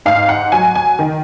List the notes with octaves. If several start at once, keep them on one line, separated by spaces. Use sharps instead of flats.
G#2 F5
F#5
F#3 G#5
G#5
D#3